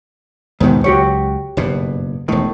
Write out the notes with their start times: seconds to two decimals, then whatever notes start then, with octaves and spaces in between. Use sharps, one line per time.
0.60 D#2 G#2 B2 D#3 B3
0.84 C#2 F#3 F#4 G4 C#5
1.57 F#1 G2 B2
2.28 E1 A2 D#3